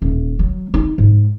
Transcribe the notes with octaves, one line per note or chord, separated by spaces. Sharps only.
D#1
F#3
D#4
G#2